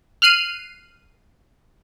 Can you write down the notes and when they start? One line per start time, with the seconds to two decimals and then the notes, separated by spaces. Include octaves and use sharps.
0.22 F6 F#6 C7 D#7